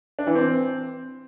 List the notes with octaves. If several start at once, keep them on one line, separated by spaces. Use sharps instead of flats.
D4
E3
C4